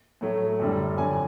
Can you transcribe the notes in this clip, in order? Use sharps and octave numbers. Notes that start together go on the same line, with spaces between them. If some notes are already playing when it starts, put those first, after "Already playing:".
A2 F#3 A3
F#2 D3 G3
F2 D3 F#3 G#5